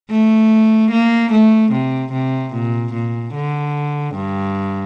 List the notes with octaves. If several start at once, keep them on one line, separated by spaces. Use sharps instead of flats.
A3
A#3
A3
C3
C3
A#2
A#2
D3
G2